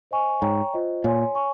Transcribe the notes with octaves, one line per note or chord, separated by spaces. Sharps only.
C5 D#5 G#5 C#6
G#2 C#5 G5 A#5 C#6
F4 C5 D#5
A#2 C#5 G#5 C6
C#5 G#5 C#6